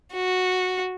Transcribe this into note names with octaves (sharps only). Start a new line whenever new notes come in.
F#4